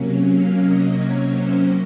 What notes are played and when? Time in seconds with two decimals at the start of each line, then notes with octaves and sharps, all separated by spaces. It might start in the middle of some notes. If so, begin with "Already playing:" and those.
Already playing: C3 F#3 A#3 C#4
0.29 F5
0.62 D#5
0.94 C#5
1.28 C5